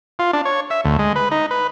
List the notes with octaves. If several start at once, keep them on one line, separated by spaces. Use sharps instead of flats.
F4
D4
C#5
E5
D2
G#3
B4
D#4
B4